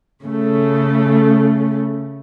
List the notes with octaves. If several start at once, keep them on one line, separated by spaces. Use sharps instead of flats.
C#3 A3